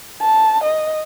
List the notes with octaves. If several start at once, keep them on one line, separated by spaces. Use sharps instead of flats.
A5
D#5